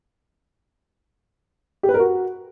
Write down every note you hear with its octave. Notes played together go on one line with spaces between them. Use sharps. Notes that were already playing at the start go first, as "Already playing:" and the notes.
G4
B4
A#4
F#4